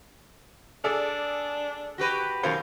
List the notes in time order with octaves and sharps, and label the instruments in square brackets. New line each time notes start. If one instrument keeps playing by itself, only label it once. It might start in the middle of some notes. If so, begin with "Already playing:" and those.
[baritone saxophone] D4 [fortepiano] G#4 A4 D5
[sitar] F#4 G4 B4
[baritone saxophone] F#2 [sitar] B2 D#3 [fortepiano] C5 F5